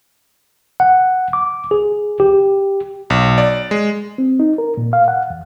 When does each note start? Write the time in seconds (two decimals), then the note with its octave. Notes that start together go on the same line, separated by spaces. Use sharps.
0.80 F#5
1.33 D6
1.71 G#4
2.20 G4
3.10 B1
3.38 D5
3.71 G#3
4.18 C4
4.40 D#4
4.58 A#4
4.77 A#2
4.93 F5
5.08 F#5
5.30 E2